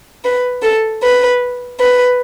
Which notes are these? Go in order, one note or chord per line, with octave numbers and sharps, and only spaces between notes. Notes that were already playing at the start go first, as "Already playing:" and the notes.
B4
A4
B4
B4